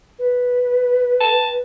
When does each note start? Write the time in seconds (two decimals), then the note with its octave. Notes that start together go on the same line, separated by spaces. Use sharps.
0.19 B4
1.21 A5